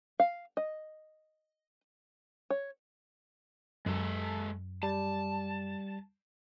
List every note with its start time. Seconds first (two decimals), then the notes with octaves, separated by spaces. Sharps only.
0.20 F5
0.57 D#5
2.50 C#5
3.86 F#2 G#3 A4
4.83 G3 A5